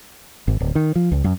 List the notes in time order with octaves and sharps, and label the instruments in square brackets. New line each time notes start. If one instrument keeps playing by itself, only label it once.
[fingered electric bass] G#1
D1
D#3
F3
C#2
F#2